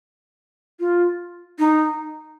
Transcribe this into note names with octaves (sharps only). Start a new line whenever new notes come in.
F4
D#4